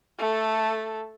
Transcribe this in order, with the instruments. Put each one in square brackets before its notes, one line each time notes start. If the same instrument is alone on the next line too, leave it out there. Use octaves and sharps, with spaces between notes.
[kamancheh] A3 A4